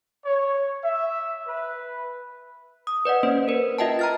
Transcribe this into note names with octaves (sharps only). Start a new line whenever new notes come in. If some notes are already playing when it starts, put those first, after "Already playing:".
C#5
E5
B4
D#6
B4 D5 D#5 F#5
A#3 C#4 C5
A#4 B4
F4 D#5 E5 G5 A5
A#5 F6 A6